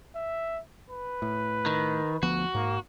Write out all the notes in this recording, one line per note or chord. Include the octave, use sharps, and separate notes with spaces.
E5
B4
A2
D#3
D2 F3 B3 F#4
G#2 A#3